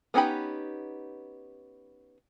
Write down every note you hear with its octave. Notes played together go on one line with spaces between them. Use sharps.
B3 C#4 D#4 G4 B5